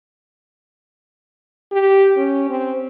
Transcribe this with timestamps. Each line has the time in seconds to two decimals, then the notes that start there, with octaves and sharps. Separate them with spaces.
1.72 G4
2.17 C#4
2.50 C4